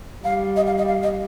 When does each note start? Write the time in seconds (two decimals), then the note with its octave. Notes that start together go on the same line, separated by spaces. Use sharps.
0.24 G3 F5
0.56 D#5
0.67 F5
0.77 D#5
0.88 F5
1.03 D#5